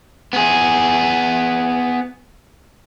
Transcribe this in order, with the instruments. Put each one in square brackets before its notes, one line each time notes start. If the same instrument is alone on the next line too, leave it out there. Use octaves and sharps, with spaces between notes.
[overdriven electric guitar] B3 G#4